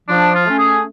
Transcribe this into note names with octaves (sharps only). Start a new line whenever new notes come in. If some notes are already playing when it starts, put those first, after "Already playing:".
F3 D4
F4
A3 C#4
G#4